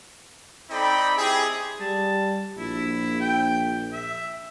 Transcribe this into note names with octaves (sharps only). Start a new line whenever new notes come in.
C4 D#4 A4 D5 G5 B5
C4 E4 G4 G#4
G3 A5
A#1 E4
G5
E5